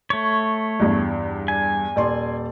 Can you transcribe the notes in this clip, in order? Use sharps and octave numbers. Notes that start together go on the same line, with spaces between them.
A3 C#5
E2 G2
G#5
D#1 D5 C6